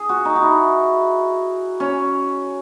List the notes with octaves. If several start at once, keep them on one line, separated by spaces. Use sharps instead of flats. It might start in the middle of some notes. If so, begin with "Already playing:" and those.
Already playing: G#4
F#4
D#4
F#4
E4
C#4